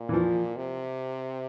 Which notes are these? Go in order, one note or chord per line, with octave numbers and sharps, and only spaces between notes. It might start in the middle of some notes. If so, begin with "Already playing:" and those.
Already playing: A#2
E3
F3
C3